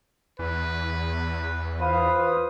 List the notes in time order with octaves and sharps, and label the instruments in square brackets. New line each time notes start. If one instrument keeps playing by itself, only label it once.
[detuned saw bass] E2 [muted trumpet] B4
[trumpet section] F4 C5 F5 [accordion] B4 D#6